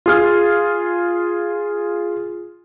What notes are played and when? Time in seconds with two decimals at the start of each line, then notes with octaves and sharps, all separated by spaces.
0.06 F4 G#4 F6